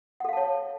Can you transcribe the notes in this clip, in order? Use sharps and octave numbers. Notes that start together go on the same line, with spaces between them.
A4 C#5 F5 F#5 A5